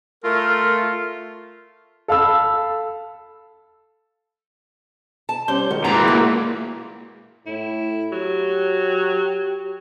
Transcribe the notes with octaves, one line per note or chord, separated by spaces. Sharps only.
A3 F4 A#4
A4 F5 B5 E6
A5
G3 C#4 C5 G6
D#3 G#3 F#4 A#4
A#2 E3 A#5
A#3
A2 E4
F#3 G4